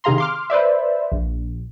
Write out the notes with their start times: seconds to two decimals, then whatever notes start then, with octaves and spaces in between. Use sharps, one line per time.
0.04 C3 D#3 G#4 F5 A#5 C6
0.18 C6 D6 F6
0.50 B4 C5 D5 E5
1.12 A#1